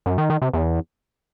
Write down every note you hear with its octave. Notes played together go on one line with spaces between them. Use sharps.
F#2
D#3
D#3
C3
E2